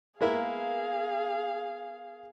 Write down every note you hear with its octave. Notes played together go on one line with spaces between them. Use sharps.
G#3 A#3 B3 E4 G#4 A#4 F5 B6